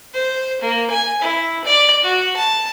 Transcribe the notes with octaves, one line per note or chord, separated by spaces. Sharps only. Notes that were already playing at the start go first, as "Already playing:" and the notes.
C5
A#3
G#5
E4
D5
F#4
A5